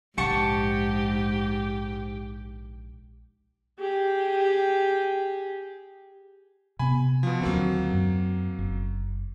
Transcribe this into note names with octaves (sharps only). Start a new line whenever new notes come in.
A#1 G#2 G4 F#5 A5 C#6
G4 G#4
C3 B3 G#5 B5
B2 F3
D#2 D3 F#3 A#3 C4
F#2
F#1